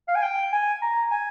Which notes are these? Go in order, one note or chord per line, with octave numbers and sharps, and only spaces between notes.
F5
G#5
G5
G#5
A#5
G#5